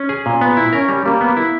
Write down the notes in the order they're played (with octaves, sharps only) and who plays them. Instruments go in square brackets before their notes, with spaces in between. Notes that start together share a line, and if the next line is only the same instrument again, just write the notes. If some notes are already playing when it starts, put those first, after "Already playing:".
Already playing: [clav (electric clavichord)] C#4
G#4
A#2
B3
E4
[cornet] C#4 [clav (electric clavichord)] A#4
[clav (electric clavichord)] G3
[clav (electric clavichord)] G3 [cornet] A#3
[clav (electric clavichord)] B3
E4